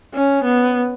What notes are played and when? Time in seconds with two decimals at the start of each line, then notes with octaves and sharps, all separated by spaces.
0.14 C#4
0.45 B3